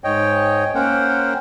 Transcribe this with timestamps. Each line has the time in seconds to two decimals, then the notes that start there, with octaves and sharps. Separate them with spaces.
0.04 G#2 C#5 D#5 G5
0.75 A#3 C#4 A#4 C5 F#5 G5